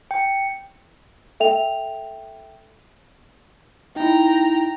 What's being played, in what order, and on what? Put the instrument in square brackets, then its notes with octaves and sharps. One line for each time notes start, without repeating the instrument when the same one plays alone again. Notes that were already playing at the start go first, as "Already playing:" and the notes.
[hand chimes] G5
[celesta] A4 E5 G5 F7
[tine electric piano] D#4 E4 [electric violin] G5 A#5